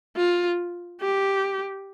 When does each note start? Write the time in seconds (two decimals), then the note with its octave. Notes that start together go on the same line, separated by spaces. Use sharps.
0.17 F4
1.01 G4